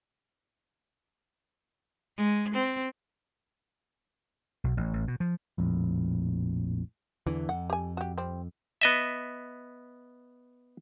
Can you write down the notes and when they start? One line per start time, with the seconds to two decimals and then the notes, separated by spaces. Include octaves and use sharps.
2.17 G#3
2.55 C4
4.64 B1
4.77 A1
4.93 A1
5.08 B2
5.20 F3
5.58 A#1 F2 A2
7.26 E2 D3 E3
7.49 F2 F#5
7.70 G4 G#5
7.97 F#4 G4
8.18 G3 C4
8.81 B3 D#5 E5